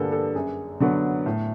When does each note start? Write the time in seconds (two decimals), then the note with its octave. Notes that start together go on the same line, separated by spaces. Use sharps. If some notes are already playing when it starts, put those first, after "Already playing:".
Already playing: G2 D3 G3 A#3 G#4 A4 B4
0.12 A4
0.35 F#2 G#4
0.80 D3 F#3 B3
1.26 A2